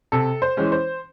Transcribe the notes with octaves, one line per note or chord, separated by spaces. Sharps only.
C3 A4
C5
E3 G#3 C#4
C5